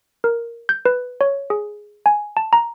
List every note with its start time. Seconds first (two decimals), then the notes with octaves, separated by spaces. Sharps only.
0.24 A#4
0.69 G6
0.85 B4
1.21 C#5
1.50 G#4
2.06 G#5
2.37 A5
2.53 A#5